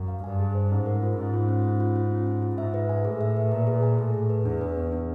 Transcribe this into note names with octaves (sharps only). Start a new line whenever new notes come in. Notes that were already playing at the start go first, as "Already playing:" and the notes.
Already playing: F#2
F5
G2 G#5
G#4
C5
G#2 C#4
A#4
F4
G#2 C#4
F4
C#4
C#4
F4
F4
C#4
C#4
F4
G#2 E5
B4
G#5
A2 G#4
E5
B4
A#2 B4
G#4
G#5
A2 G#4
G#4
B4
E2 D4
B4
B3
D4